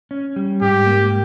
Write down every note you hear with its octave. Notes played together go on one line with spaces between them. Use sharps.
C#4
G3
G#2 G4
A#3